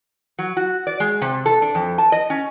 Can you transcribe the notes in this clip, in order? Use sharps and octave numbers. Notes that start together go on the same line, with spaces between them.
F#3
F#4
D5
G#3
C3
A4
D4
F2
A5
D#5
C#4